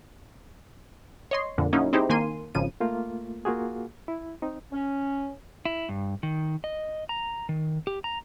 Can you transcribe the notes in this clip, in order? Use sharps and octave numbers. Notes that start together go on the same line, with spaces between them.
C#5 D#5 C6
F2 A#2 D3
F#3 A#3 C#4 D#4 E4
C4 D#4 E4 G4 G#4 C5
D#3 A#3 G#5 C6 D#7
G#1 C#3 F3 D#7
A3 A#3 F4
A#3 F4 F#4 G#4
E4
C4 D#4
C#4
E4
G2
D#3
D#5
A#5
D#3
G4
A#5